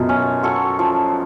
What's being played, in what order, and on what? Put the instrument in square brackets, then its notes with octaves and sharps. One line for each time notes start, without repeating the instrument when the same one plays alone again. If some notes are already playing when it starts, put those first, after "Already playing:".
Already playing: [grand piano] F#2 B2 [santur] F4 A4
[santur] C#4
F#4 A4 C#5
F3